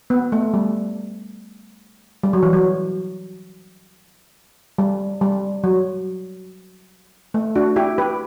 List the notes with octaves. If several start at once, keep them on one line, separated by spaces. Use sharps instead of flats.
B3
A3
G3
G3
F#3
E3
F#3
G3
G3
F#3
A3
D4 F#4
E4 G4
G4 B4